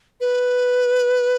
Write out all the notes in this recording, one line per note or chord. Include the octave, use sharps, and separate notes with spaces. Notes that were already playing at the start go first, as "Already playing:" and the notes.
B4